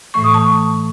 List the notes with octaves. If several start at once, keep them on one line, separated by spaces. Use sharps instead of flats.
A2 E3 A3 C#6
D#6
A5 C#6